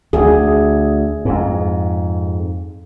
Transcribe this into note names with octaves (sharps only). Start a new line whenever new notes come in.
D2 G#4
F2 G#2